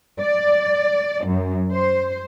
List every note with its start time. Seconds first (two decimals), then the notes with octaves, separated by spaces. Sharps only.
0.20 D5
1.25 F#2
1.73 C5